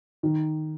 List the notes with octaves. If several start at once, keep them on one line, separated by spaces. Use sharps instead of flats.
D#3